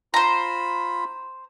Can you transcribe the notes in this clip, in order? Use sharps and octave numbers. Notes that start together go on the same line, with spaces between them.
F4 C5 A#5 B5